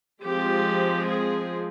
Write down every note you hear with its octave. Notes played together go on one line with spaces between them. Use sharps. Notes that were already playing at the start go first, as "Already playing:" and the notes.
F3 G#3 C4 G4
G#4